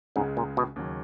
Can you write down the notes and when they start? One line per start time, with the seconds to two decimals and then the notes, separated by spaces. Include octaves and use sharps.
0.16 C#2 G#2 C#3 G#3
0.37 A#2
0.57 B2
0.76 D#2 C#3 F#3